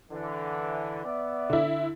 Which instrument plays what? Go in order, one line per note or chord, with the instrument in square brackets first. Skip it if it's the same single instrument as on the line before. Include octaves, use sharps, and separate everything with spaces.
[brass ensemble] D3 E3
B3 D5 E5
[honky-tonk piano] D3 E4